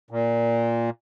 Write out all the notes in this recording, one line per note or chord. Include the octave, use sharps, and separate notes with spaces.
A#2